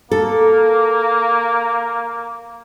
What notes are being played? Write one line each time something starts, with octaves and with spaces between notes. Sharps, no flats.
A#3 A4